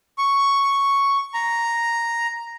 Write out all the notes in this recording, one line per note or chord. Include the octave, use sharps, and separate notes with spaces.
C#6
A#5